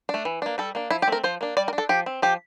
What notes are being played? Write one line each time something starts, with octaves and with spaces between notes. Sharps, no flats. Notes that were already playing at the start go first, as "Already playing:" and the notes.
A3 D4
E3
A#3 D4
G3 A4
A#3 D4
F3 E4
G4
A3 C4 A#4
F3 C5
A#3 D4
G3 D5
A#4
D4
A4
F3 G4
C4
F3 G4